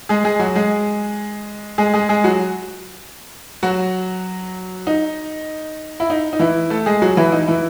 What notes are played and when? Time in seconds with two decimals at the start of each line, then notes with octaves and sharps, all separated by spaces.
0.09 G#3 G#4
0.24 G#3 G#4
0.40 F#3 F#4
0.55 G#3 G#4
1.78 G#3 G#4
1.94 G#3 G#4
2.09 G#3 G#4
2.24 F#3 F#4
3.63 F#3 F#4
4.87 D#4
6.00 E4
6.10 D#4
6.33 D#4
6.39 E3 E4
6.70 A3 A4
6.86 G#3 G#4
7.02 F#3 F#4
7.17 E3 E4
7.32 D#4
7.47 E3 E4